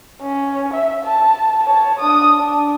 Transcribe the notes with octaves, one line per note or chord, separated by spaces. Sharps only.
C#4
E5
A5
C#5 A5
D4 D#6
D4